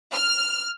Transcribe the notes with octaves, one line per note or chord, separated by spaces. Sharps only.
F6